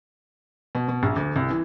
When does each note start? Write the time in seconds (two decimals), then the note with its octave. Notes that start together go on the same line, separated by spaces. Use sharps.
0.75 B2
0.88 B2
1.03 A#1
1.16 D2
1.36 C2
1.50 E3